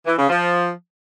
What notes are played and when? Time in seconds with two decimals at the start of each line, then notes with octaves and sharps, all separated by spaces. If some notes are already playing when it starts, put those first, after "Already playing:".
0.06 E3
0.18 C#3
0.30 F3